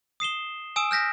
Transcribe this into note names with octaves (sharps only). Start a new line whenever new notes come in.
D#6 C7 E7 G7
G#5 D#6 E6 D7 E7
F6 G6 A#6 B6